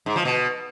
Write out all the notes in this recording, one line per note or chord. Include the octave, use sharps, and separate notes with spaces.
G#2
F3
B2